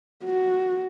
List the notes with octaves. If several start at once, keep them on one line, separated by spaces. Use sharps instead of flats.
F#4